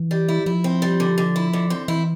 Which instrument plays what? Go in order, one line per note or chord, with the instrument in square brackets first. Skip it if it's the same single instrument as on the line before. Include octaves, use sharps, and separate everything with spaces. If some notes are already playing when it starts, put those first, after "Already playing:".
Already playing: [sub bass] E3
[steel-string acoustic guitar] G3
E4
[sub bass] F3 [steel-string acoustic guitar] E4
[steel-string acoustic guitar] C4
G3
D3
D3
E4
D3
C4
[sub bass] E3 [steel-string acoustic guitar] E4